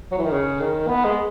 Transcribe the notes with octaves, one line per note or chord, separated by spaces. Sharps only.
F#3
E3
D#3
C#3
D#3
B3
G#3